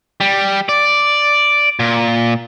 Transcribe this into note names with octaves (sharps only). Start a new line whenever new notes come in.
G3
D5
A#2